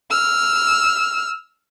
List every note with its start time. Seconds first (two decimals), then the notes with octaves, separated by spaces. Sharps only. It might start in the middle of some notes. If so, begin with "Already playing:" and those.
0.10 E6 F6